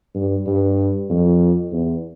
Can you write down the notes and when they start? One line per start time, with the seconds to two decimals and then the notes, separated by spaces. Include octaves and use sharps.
0.15 G2
0.46 G2
1.09 F2
1.72 E2